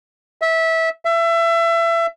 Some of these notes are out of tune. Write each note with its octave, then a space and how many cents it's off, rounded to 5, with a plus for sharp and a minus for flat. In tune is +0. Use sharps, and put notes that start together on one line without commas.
E5 -20
E5 +25